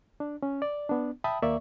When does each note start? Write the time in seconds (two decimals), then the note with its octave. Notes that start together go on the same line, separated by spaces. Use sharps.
0.20 D4
0.43 C#4
0.62 D5
0.89 B3 D4
1.24 E5 G5 A5 B5 D#6
1.42 D#2 A#3 D5 E5 C#6